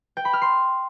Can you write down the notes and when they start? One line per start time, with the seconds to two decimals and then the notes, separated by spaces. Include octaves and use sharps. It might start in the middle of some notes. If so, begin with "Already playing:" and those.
0.17 G5
0.25 B5
0.33 F6
0.41 C6